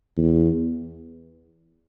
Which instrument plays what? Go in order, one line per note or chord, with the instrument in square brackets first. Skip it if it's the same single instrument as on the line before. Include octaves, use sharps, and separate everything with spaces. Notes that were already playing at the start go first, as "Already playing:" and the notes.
[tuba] E2